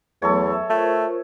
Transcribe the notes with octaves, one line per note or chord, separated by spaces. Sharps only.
E2 F#3 A3 B3 A4 C#5
E5 A5
A3 F4 A#4 C5